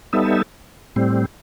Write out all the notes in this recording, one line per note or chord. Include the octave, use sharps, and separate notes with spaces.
G3 B3 D#4 A4 E5
A2 G3 C4